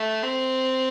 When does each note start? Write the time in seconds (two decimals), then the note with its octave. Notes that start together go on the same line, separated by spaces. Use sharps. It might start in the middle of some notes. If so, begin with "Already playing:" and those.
Already playing: A3
0.23 C4